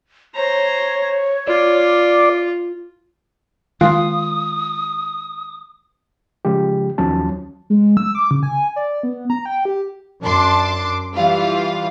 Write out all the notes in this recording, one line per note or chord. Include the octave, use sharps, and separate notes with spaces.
C5 C#5 A#5
F4 D5
D#3 G#3 F4 D#6
C#3 F3 G#3 G4
D#2 D#3 F3 F#3 C#4 A5
G#3
E6
D6
C#3
G#5
D5
B3
A#5
G5
G4
F#2 D4 A5 C6 D6
E3 G3 F4 F5